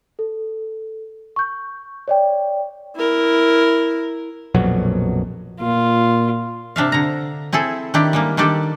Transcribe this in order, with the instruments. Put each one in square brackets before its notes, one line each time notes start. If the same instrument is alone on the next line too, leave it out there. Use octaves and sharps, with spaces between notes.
[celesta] A4
C#6 G6
C#5 D5 G5
[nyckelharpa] E4 A#4
[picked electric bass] A#1 F2 B2 F#3
[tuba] A#2 [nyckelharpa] F4
[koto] C3 D4 E5 F5
D3 A#5
C4 E4 G#4 A4
D#3 D4 E4 G4
G3 G#3 A#3
D#3 G3 D4 G4 A4